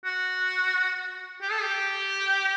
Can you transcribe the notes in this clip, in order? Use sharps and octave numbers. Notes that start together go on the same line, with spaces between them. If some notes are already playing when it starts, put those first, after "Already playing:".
F#4
G4
A4
G4